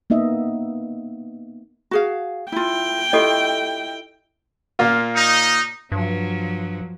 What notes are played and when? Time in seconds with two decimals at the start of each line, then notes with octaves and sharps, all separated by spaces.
0.10 A#3 B3 D#4 D#5 E5
1.91 F#4 G#4 F5
2.52 E4 F4 G5
3.13 E4 F4 G4 A4 D#5
4.79 A#2 A#3 F4
5.16 D#4
5.92 G2 F3 F#3